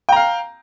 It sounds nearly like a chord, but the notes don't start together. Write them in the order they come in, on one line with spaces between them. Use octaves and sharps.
G5 A#5 F5